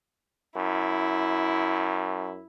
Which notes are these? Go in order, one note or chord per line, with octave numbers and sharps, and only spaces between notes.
F#2 E4